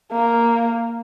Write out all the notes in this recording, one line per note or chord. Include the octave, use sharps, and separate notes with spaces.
A#3